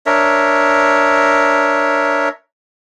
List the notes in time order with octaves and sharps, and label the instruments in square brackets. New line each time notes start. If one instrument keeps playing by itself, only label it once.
[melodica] D4 A#4 C#5 E5